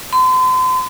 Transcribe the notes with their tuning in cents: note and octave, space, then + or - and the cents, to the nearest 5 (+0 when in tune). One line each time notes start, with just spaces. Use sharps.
C6 -40